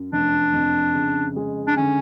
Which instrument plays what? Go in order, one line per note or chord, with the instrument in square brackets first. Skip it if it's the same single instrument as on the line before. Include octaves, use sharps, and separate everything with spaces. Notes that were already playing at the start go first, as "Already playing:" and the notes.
Already playing: [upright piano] F#2
[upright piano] F1 [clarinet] D4
[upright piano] F2
C#3
G#3
[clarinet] D4
[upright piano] D3 [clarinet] C#4